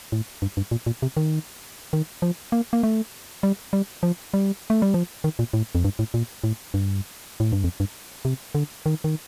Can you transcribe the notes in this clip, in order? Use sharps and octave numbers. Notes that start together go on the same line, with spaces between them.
A2
G2
G2
A#2
A#2
C3
D#3
D#3
F3
A#3
A#3
A3
G3
G3
F3
G3
A3
G3
F3
D#3
A#2
A2
F2
G2
A2
A#2
A2
G2
A2
G2
F2
G2
C3
D3
D#3
D#3